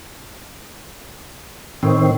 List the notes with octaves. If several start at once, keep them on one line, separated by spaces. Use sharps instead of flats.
A2 D#3 C4